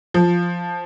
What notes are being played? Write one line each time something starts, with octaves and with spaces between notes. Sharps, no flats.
F3